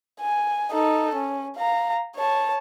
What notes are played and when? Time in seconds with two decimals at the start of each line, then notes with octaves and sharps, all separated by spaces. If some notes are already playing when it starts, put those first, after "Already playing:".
0.20 G#5
0.71 D#4 A4
1.15 C#4
1.57 F5 A#5
2.16 C#5 A5